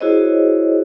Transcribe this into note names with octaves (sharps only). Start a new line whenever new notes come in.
E4 F#4 G#4 C5 C#5 D#5